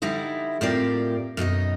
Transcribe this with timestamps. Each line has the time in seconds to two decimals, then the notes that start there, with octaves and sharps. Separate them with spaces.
0.02 D3 G3 D#4 E4 C5
0.61 A2 C4 F4 G4 A#4 D5
1.37 F#2 B2 D#4 D#5